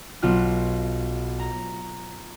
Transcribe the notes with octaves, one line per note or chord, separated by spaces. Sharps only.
B1 F4 F#6
A#5